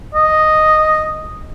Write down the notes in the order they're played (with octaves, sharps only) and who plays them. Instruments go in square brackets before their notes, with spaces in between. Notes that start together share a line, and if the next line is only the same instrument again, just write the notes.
[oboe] D#5